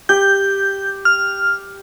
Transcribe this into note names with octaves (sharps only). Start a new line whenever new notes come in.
G4 G6
F6